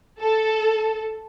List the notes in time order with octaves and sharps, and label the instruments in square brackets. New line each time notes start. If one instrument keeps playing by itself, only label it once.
[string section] A4